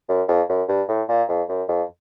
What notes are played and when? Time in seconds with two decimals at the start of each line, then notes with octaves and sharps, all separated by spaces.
0.09 F#2
0.28 F2
0.49 F#2
0.69 G2
0.88 A2
1.09 A#2
1.29 F2
1.49 F#2
1.69 F2